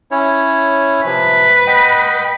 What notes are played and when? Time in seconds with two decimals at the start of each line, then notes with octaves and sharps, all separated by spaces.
0.11 C#4 E4 C#5
1.05 C3 F3 B4
1.67 D#5 F#5 G5